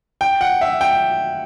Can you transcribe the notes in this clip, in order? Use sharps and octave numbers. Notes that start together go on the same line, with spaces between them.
G5
F#5
E5
G5